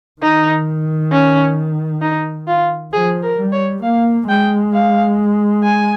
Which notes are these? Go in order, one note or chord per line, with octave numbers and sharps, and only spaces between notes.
D#3 D#4
C#4
D#4
F4
F3 G#4
A#4
G3
C#5
A#3 F5
G#3 G5
F5
G#5